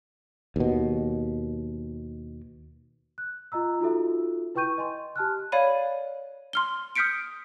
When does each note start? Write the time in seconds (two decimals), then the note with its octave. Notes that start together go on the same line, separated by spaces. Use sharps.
0.56 D#2 B2
3.18 F#6
3.52 F4 D#5 A#5 E6
3.80 D#4 F4 F#4 A4 E5
4.55 E4 B4 G5 C#6 G6 D#7
4.78 D#5 G#5 C6
5.16 G4 A5 F6 F#6
5.52 C#5 D5 F5 B5 D#7
6.53 C6 F6 G7
6.96 D#6 F6 G6 B6 C#7 D7